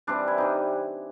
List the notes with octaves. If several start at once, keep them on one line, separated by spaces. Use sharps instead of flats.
C3 E3 G3 D4
E4
C3 E3 G3 D#4